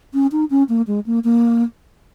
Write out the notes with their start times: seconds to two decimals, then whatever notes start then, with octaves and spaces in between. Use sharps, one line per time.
0.14 C#4
0.32 D#4
0.50 C#4
0.69 A#3
0.87 G#3
1.06 A#3
1.24 A#3